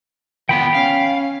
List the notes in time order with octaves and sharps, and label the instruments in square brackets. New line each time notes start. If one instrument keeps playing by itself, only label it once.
[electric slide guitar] D#3 F3 B3 [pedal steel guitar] G5 B5
[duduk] C#4 [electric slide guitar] F5